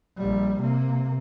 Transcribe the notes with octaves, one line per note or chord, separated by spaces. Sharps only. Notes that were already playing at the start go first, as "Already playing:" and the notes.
A#1 G3
C3 A#3